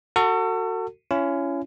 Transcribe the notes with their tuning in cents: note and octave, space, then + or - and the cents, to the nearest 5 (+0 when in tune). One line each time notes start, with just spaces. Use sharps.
F#4 +0 A4 +35
C#4 +10 E4 +45